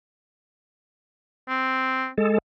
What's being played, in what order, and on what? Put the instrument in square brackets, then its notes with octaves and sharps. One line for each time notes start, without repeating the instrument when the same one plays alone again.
[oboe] C4
[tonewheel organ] G#3 A4